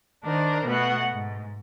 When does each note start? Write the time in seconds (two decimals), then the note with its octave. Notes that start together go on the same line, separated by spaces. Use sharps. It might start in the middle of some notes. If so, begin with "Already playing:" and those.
0.23 D#3 D4 A#4 C5
0.66 B2 A3 B3 F#4 F#5
1.11 G#2